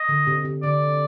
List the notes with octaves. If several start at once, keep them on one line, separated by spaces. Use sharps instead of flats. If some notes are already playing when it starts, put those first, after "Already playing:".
Already playing: D#5
D3
C3
C3
D3 D5